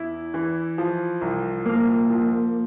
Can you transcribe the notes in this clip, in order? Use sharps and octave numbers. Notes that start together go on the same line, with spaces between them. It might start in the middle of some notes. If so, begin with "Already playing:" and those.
Already playing: E2 E4
E3
F3
C2
F3 A#3
F3